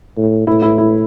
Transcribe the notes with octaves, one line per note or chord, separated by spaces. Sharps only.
A2
A2 E4
E4
E4